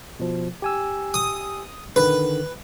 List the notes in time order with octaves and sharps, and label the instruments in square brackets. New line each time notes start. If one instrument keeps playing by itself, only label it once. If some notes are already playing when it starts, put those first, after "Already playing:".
[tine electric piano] B2 F3
G4 G#5 E6
[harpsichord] D#6
[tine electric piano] D3 D#3 [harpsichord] B4